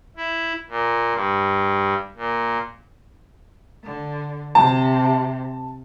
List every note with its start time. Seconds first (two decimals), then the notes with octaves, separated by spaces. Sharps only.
0.17 E4
0.69 A#2
1.13 G2
2.16 A#2
3.84 D3
4.55 C3 A5